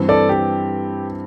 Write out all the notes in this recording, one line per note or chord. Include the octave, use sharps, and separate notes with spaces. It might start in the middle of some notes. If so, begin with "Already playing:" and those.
Already playing: G2 E3 C4
A4 D5
G4